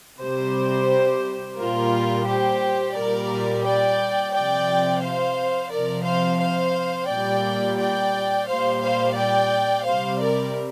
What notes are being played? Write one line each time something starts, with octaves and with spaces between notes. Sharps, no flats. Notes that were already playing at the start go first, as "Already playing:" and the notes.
C3 G3 G4 C5
A#2 G3 F4 A#4
G4 C5
A#2 G3 A#4 D5
D5 G5
C3 F3 D5 G5
C5 F5
C3 F3 A#4 D5
C5 F5
C5 F5
A#2 G3 D5 G5
D5 G5
A#2 G3 C5 F5
C5 F5
D5 G5
C3 G3 C5 F5
A#4 D5